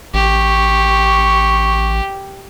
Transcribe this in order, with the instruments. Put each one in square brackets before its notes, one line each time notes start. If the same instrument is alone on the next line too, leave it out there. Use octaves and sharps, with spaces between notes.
[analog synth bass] A1 [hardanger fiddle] G4 [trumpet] C#6